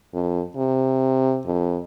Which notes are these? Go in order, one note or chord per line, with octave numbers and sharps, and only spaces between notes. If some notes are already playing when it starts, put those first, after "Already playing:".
F2
C3
F2